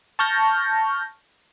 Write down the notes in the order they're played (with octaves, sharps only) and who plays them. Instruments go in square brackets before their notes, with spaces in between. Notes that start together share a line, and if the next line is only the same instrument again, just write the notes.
[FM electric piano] A5 C#6 F6 G6 A#6